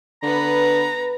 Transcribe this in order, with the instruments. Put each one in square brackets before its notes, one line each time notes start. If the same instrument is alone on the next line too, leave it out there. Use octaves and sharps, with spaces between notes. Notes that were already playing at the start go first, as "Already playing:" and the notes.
[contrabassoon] D3 [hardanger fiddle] B3 B4 [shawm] A#5